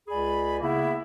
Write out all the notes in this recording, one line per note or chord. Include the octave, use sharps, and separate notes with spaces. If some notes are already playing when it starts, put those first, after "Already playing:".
C#2 G#4 D5 G#5 B5
C#3 A#3 B3 E4